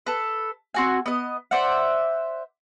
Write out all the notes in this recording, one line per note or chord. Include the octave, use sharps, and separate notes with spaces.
A4 B4
C4 F#4 G#5
B3 D#5
C5 D5 E5 F#5